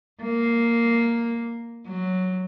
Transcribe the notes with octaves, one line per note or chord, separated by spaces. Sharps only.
A#3
F#3